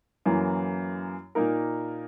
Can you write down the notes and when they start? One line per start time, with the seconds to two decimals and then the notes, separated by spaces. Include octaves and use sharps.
0.26 F#2 E3 A#3
1.35 A#2 A#3 D#4 A#4